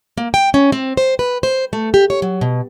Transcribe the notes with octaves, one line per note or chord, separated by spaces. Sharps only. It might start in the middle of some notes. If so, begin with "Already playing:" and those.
A#3
G5
C#4
C4
C5
B4
C5
A3
G4
C#5
F#3
B2